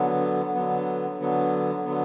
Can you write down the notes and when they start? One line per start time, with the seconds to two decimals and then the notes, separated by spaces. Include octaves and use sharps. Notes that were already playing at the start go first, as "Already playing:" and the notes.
Already playing: D3 F#3 B3
0.54 D3 F#3 B3
1.19 D3 F#3 B3
1.84 D3 F#3 B3